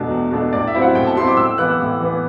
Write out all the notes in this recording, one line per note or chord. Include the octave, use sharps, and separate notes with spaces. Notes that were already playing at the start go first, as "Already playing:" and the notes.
Already playing: E2 B2 A3 D4
E2
B2 A3 D4
A2 D5
E5
F#3 C4 E4
F#5
A2 G5
A5
F#3 C4 E4 C6
D6
A2 E6
E3 B3 F#6
A2
E3 B3